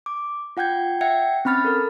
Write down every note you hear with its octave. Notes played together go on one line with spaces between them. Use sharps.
D6
F4 F#5 G5 G6 G#6
E5 F#5 G5 G#6 C#7
C4 C#4 B5 F6 A6
A4 A#4